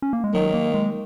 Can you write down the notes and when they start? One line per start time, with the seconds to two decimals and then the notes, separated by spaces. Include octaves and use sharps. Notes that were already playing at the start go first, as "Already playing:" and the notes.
0.02 C#4
0.13 A#3
0.24 G#3
0.34 D#3 F#3
0.54 A#3
0.74 G#3